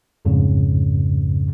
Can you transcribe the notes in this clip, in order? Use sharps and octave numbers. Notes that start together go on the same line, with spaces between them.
C2 F2 G#2 C#3